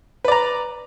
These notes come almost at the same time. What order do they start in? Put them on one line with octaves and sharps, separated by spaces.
B4 D5 A#5